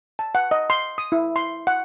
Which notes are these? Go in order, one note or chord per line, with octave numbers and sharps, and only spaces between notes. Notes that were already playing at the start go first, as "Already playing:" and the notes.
A5
F#5
D#5
C6
D#6
E4
C6
F#5